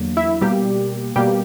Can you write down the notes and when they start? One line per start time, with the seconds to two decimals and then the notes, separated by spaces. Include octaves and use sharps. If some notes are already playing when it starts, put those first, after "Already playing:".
Already playing: E2 D3 F#3 A#3
0.17 E4 E5
0.41 B2 G3 A#3 G4
1.16 B2 G3 A#3 G4